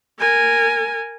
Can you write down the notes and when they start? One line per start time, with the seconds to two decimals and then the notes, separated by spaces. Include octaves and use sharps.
0.19 A#4 G#5